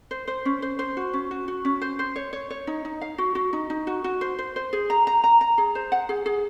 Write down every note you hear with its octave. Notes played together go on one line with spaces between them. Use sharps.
C5
C5
C#4
C5
C5
F#4
C#4
F#4
F#4
C#4
C5
C5
C#5
C#5
C#5
D#4
D#4
F5
F#4
F#4
D#4
D#4
F#4
F#4
C5
C5
C5
G#4
A#5
A#5
A#5
A#5
G#4
C5
F#5
G#4
G#4